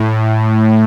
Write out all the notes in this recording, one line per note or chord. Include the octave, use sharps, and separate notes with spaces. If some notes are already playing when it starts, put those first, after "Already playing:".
Already playing: A2